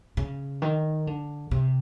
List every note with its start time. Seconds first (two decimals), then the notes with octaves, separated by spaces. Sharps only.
0.17 C#3
0.62 D#3
1.07 D3
1.51 C3